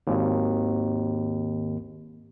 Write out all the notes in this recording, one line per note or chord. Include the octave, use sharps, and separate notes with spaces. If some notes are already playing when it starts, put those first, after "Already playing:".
G#1 D#2